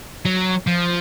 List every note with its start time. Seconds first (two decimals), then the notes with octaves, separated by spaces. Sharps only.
0.25 F#3
0.67 F3